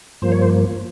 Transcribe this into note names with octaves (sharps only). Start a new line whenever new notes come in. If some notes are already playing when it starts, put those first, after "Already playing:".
G2 F3 A#3 C5
C#5
C5